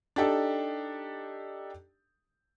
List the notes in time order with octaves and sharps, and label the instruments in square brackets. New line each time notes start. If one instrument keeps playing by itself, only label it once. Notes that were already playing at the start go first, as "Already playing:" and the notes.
[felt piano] D4 D#4 G4 A4